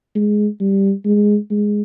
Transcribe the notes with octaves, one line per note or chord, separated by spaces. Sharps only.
G#3
G3
G#3
G#3